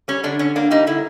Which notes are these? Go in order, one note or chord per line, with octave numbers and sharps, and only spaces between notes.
G3 C#4
D3 D4
D3 C#4
A#3 D4
G3 D#4
D3 E4